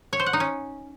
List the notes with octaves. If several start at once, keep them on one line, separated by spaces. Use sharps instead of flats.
C#5
C5
F#5
D#4
C#4